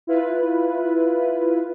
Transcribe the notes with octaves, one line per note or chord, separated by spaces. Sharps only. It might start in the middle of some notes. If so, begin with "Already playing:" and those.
E4 F4 B4